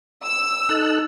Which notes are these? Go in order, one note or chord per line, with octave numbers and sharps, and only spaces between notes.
E6
D#4 A4 F#6